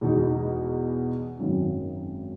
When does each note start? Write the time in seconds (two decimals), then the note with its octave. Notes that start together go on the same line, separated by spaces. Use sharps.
0.01 E2 B2 G#3 D#4
1.38 G#1 F#2 D#3 F#3 C#4